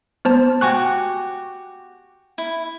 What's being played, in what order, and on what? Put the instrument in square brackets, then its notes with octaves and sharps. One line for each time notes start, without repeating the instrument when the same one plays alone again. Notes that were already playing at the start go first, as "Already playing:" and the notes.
[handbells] B3 C5 A5
[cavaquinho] F#4 G4 [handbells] G#5 C#6 F#6
[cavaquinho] E4